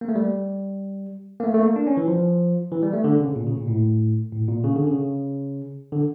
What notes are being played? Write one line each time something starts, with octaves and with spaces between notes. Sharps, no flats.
A#3
A3
G3
A#3
A3
A3
A#3
D4
C#4
E3
F3
E3
G3
A3
D3
C#3
A#2
C#3
A#2
A2
A2
A#2
C#3
D3
C#3
D3